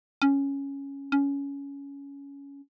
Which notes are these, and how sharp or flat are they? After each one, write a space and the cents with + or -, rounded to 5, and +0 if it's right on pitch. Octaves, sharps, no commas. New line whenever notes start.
C#4 +0
C#4 +15